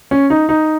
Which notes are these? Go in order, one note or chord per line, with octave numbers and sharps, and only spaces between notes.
C#4
D#4
D#4